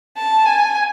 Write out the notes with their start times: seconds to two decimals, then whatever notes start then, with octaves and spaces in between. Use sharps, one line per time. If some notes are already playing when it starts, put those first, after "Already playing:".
0.17 A5
0.46 G#5